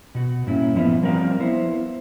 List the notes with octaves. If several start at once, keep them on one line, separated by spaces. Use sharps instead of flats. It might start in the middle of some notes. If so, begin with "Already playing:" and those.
B2 F#4
G2 A#2 A#3 C#4 E4
F3 A3 B3 E4 D#5 F5
F3 G3 C4 A#4 D5 F5
B3 E4 C5